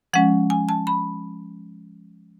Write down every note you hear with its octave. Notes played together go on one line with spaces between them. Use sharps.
F3 G#3 C#4 F#5
G#5
A5
B5